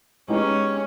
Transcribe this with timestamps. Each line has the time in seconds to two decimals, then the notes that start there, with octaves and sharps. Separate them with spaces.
0.28 G#3 B3 C#4 D#4 G4